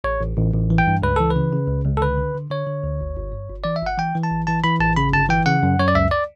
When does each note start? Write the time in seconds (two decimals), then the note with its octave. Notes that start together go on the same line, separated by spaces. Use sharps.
0.04 A1 C#5
0.21 A1
0.37 A1
0.54 A1
0.70 E3
0.78 G5
0.87 G2
1.02 C#2 B4
1.16 E3 A4
1.30 B4
1.36 C#3
1.53 C#3
1.68 C#2
1.85 C#2
1.97 A4
2.01 D3 B4
2.17 D3
2.34 D3
2.50 D3 C#5
2.67 D3
2.83 D2
3.00 G1
3.17 G1
3.32 G2
3.49 G1
3.64 E3 D5
3.76 E5
3.81 G1
3.86 F#5
3.98 E3 G5
4.15 E3
4.23 A5
4.31 A1
4.47 E3 A5
4.64 E3 B5
4.80 A1 A5
4.96 C#3 B5
5.13 G1 A5
5.29 E3 G5
5.46 C#3 F#5
5.63 F#2
5.79 F#2 C#5
5.88 D5
5.95 C#2 E5
6.11 D5